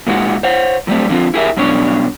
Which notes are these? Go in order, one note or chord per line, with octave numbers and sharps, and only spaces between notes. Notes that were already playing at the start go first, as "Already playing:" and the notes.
A#2 G#3 D#4 F#4
C5 C#5 F#5
A2 F#3 G3 A3 C4
D3 F3 C4 F4
E4 G4 G#4 A#4 D#5 E5
G2 B2 F#3 C#4 D4 C#5